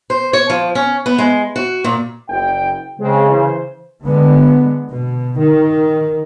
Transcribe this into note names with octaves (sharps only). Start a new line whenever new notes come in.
C5
C#5
F3
C#4
B3
G#3
F#4
A#2
F#1 G5
C#3 G#3 C4
E3 C5
D3 G#3 B3
B2
D#3